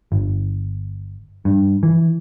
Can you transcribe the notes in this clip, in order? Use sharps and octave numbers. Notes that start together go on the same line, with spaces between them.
G1
G2
E3